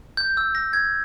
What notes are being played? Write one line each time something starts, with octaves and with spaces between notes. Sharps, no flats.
G6
E6
A#6
G#6